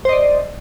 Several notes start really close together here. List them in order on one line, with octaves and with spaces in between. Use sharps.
C5 D#5 D5